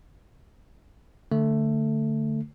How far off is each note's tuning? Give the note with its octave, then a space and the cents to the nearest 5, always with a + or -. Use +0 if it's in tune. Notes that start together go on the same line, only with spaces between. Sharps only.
D3 +0 A3 +10